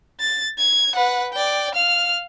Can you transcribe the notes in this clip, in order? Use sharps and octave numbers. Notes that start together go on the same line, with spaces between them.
A6
G#6
B4 F#5
D5 G5
F5 F6